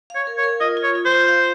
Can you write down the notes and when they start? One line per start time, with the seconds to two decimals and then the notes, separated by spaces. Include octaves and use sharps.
0.10 F5
0.15 C#5
0.27 A#4
0.38 C#5
0.43 A#4
0.61 F4 D#5
0.77 F4
0.84 C#5
0.95 F4
1.05 C5
1.12 F4
1.28 F5